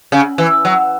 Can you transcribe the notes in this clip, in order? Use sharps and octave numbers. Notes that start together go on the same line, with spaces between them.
C#3
E3
F#3